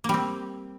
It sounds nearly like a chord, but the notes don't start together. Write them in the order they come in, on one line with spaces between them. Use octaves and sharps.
A#3 G3 C4